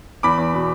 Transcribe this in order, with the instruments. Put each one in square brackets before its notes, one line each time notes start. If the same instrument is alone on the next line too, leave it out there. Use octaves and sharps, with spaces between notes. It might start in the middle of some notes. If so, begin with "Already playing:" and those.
[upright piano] E2 [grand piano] B5 D6
[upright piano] E2
B2